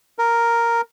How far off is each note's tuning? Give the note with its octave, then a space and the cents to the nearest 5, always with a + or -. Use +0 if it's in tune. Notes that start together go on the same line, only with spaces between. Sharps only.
A#4 +0